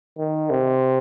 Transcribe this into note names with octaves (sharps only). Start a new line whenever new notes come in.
D#3
C3